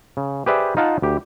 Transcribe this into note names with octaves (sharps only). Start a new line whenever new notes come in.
C#3
G4 G#4 B4 C5 D5 E5
D#4 F4 F5 F#5 A5
D2 G4